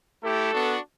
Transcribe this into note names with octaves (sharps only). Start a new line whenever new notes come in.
A3 E4 G4 A4
B3 D4 F#4